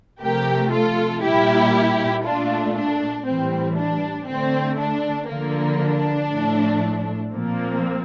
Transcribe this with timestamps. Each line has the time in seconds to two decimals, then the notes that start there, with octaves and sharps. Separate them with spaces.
0.21 C3 F3 A3 G4 A#4
0.72 F4 A4
1.23 A#2 G3 A#3 E4 G4
2.24 A#2 A3 D4 F4
2.75 D4
3.26 A2 E3 G3 C4
3.77 D4
4.27 D3 A3 C4
4.78 D4
5.29 D3 F3 A#3
5.80 D4
6.30 A2 F3 A3
7.31 A#2 F3 A#3 C4